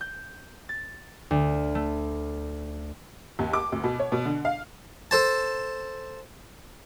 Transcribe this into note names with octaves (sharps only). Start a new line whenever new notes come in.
G6
A6
D2
A3
D#2
D6
D2
B2
C#5
B2
D3
F5
A4 C5 A5